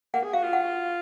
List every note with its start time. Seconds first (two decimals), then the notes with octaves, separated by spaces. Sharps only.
0.14 A#3 F#5
0.23 G#4
0.33 F#4 F5
0.43 F4
0.53 F#5